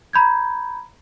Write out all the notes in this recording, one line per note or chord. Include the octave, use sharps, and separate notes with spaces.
A#5 B5 G6 G#6